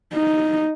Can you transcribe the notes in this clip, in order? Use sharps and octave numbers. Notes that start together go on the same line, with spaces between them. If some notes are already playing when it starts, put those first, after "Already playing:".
D#4